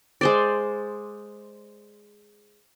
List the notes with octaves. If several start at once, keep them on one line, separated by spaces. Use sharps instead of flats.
G#3 C5 D5